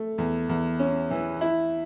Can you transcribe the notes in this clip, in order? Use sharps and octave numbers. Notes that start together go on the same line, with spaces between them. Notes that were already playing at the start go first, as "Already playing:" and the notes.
Already playing: A3
E2
E2
C#4
E3
E4